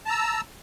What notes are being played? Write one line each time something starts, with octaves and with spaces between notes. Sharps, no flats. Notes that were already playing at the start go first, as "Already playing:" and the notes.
A5 A#5 E6